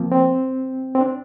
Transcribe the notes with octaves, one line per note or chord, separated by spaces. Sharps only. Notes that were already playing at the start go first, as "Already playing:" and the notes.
Already playing: F3 A#3 C4
C4
C4
D4